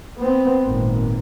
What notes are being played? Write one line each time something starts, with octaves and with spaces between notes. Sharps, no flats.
B3 C4
G#1 A#2